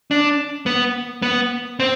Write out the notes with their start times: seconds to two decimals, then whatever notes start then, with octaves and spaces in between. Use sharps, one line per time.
0.11 D4
0.66 B3
1.22 B3
1.80 C4